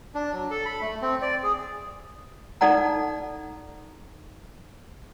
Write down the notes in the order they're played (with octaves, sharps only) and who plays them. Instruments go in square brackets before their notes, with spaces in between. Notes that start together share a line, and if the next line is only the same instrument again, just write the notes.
[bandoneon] D4
F#3
A4
B5
A3
C4
D5
G#4
[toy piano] D#4 A4 D5 F#5 A#5